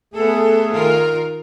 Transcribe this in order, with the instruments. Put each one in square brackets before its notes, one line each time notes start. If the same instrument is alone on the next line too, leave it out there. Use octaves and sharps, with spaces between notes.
[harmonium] A3 G#4 [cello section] B3 A4
[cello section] D#3 F4 A#4